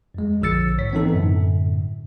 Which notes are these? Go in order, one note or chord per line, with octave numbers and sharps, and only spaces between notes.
F2 G#3
A#1 D3 F3 E6 A6 C#7
G#2 C#5 B6
E3 B3 C4 D#4 A4
F#2 A2 D3